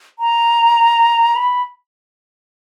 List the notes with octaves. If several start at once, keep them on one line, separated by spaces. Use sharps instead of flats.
A#5
B5